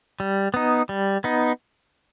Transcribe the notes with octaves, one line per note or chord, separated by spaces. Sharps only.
G3
B3 D#4
G3
B3 D#4